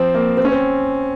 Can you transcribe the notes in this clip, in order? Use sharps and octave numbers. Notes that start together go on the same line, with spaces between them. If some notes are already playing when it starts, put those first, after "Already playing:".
Already playing: F3 C4
A#3
C4
C#4
C4